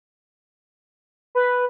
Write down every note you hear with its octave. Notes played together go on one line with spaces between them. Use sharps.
B4